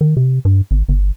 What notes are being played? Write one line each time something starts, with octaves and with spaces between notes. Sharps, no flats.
D#3
C3
G2
G#1
G1